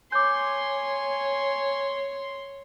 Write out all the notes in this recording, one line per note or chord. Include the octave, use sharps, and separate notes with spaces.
C#5 G#5 C6 D6 G6